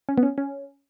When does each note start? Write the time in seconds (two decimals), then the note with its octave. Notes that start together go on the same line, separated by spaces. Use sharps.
0.09 C#4
0.18 B3
0.23 C#4
0.38 C#4